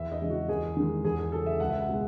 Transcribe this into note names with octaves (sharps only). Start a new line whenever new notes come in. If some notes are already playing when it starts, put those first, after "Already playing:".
Already playing: E2 E5
D#5
C#3 E3 G#3
F#4
E2 G#4
D#3 G#3
E2 G#4
G#4
C#3 F#3 A4
E5
C#2 F#5
E5
F#5
B2 G#3